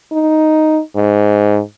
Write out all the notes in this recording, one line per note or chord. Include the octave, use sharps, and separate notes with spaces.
D#4
G#2